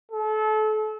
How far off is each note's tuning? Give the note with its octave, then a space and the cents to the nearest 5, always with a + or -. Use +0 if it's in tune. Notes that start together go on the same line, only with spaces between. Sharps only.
A4 -30